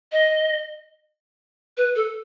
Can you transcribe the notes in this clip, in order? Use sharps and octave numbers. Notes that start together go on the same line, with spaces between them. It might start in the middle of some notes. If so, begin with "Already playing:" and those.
D#5
B4
A4